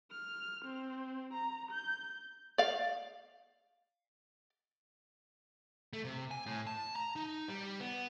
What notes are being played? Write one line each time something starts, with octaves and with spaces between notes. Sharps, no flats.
F6
C4
A#5
G6
D5 F5
A3
C3
G#5
A2
A5
A#5
D#4
G3
B3